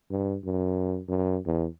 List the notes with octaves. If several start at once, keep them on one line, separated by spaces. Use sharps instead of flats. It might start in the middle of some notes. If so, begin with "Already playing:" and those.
G2
F#2
F#2
E2